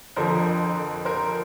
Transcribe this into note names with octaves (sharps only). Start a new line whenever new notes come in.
F2 D3 F3 A#4 C5
A#4 C5